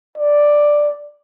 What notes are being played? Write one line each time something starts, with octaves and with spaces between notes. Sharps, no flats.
D5